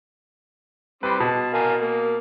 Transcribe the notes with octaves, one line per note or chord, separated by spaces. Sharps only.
G3 C4 B4
B2 A5
A#4 F5 G#5
A#3